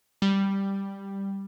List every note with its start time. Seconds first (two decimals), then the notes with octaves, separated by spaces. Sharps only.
0.22 G3